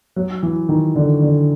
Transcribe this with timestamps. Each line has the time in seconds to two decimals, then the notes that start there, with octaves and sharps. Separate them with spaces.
0.16 F#3
0.43 E3
0.69 D#3
0.96 D3
1.22 D3